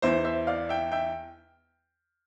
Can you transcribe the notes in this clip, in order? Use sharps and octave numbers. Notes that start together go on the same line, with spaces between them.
E2 E3 C5 E5
C5 E5
D5 F5
E5 G5
E5 G5